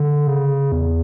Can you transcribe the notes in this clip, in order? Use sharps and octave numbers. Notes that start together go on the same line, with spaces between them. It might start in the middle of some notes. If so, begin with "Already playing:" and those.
Already playing: D3
C#3
E2